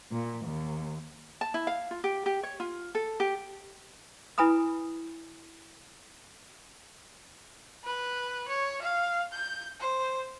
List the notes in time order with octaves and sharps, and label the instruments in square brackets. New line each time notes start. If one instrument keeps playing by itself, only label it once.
[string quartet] A#2
D#2
[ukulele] A5
E4
F5
F4
G4
G4
C#5
F4
A4
G4
[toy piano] E4 B4 G#5 A#5 B5 D#6
[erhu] B4
C#5
F5
G6
C5